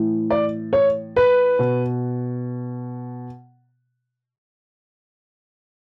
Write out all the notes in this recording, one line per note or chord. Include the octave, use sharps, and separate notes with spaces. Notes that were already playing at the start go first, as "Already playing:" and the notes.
Already playing: A2 E3
D5
C#5
B4
B2